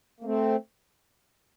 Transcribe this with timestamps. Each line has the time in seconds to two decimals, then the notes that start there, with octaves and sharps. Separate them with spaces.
0.20 A#3
0.24 A3 C4